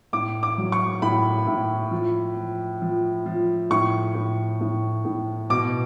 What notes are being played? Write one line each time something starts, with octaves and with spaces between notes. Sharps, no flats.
A2 D6
D6
F#3
C#6
A2 B5
A2
F3
F3
F3
F3
A2 C#6
A2
A2
A2
B2 D6